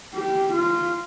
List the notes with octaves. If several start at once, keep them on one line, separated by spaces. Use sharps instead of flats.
G4
F4